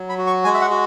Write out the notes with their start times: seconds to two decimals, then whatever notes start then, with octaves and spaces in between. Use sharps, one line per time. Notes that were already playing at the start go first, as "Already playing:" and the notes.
Already playing: F#3
0.09 B5
0.18 F#4
0.27 C#6
0.44 G#3 G#5
0.54 E5
0.61 F#5
0.70 F#4